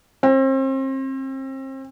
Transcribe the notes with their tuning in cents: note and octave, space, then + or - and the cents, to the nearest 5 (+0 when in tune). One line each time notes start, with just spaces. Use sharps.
C4 +35